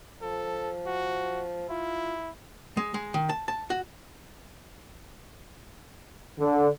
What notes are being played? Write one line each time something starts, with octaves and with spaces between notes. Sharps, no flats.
F3 A4
F#4
E4 F4
G#3
G#3
D#3
A5
A5
F#4
D3